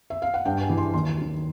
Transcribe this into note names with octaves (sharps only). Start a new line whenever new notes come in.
E5
F5
F#5
G2 G5
G#5
E3
C6
D#2 C6
D#3 F#3